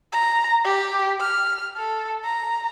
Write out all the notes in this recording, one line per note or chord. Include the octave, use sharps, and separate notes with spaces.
A#5
G4
F6
A4
A#5